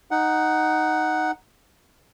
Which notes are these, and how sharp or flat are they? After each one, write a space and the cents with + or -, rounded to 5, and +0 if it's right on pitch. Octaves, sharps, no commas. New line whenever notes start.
D#4 +0 F#5 +5